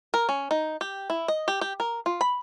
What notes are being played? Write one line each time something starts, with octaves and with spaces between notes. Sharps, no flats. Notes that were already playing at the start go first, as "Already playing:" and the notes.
A#4
C#4
D#4
G4
E4
D#5
G4
G4
A#4
F4
B5